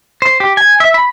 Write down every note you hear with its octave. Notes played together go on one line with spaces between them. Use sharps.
C5
G4
G#5
E5
B5